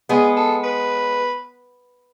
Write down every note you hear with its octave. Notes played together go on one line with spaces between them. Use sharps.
G#3 B3 G#4
A4
B4